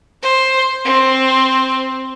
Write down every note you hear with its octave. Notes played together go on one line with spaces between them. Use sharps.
C5
C4